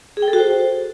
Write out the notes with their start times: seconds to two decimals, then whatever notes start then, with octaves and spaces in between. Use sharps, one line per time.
0.17 G#4
0.22 G5
0.28 A4
0.33 F#4
0.39 C5